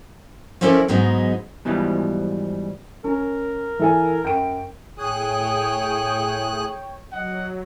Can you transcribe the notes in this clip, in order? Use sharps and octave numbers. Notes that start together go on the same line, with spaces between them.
F3 C#4 E4 A4 A#4 D5
G#2 F#3 G#3 B3 D#4
G#2 B2 E3 F3 G3
C#4 A#4
E3 A4 G#5
F#2 G5 D7
A2 G#4 C#5 G5 D#6 F#6
F#3 D#5 F#5